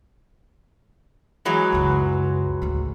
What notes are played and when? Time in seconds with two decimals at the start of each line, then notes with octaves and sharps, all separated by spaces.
1.45 E3 F#3 G#3
1.72 C#2 F#2
2.62 A1 D2